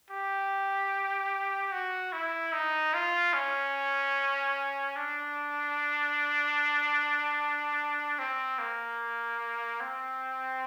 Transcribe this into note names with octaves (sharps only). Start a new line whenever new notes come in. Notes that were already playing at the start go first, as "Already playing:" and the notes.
G4
F#4
E4
D#4
F4
C#4
D4
C4
A#3
C4